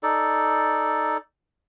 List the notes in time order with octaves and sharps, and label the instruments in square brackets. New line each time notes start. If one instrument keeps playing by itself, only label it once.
[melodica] D#4 A4 D5